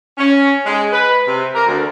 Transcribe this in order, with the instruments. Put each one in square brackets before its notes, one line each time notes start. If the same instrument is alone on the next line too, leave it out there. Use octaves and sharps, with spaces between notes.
[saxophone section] C#4
G#3
B4
C3
A#4
D2